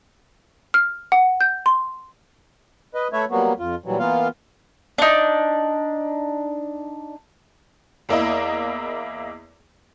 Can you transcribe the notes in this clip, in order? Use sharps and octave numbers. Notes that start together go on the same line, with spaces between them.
F6
F#5
G6
C6
B4 D#5
A3 B4 C#5 E5
F#3 G3 A#3 B3 F#4
F2 F4
A#2 E3 F#3 G3
E3 A#3 B3 F4 F5
D4 D#4
E2 A#3 E4 D#5